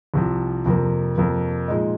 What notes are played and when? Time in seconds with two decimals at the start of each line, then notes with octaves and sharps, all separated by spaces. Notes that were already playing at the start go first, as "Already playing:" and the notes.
0.14 C2 C3 F3
0.66 F2 C3 F3 A#3
1.18 F2 C3 F3 A#3
1.68 A#2 F3 G#3 D#4